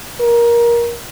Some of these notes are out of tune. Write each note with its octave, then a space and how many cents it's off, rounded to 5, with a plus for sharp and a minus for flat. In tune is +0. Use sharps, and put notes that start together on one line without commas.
A#4 +20